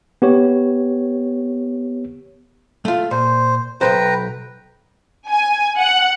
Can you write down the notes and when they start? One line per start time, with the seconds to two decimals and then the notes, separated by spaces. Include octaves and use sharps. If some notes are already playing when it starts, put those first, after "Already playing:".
0.22 B3 G4 C#5
2.85 A3 F4
3.11 A#2 C5
3.81 B1 A#2 B4 C5 G5 A#5
5.29 G#5
5.78 F#5